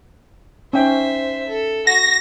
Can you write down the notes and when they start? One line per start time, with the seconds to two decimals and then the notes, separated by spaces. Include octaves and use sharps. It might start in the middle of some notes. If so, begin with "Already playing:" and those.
0.73 C#4 D#4 C5 E5 G5
1.48 A4
1.87 F#4 A#6